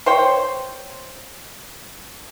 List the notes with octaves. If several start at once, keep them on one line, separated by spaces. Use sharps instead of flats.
C5 C#5 G5